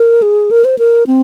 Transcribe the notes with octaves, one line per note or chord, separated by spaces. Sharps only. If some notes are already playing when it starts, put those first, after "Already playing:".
Already playing: A#4
G#4
A#4
C5
A#4
C4